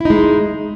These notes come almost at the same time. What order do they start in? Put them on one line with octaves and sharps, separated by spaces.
E4 D#4 G#3